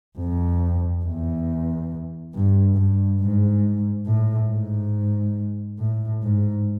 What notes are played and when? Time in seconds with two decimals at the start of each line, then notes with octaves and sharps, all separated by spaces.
0.18 F2
1.04 E2
2.35 G2
2.76 G2
3.21 G#2
4.06 A2
4.50 G#2
5.79 A2
6.23 G#2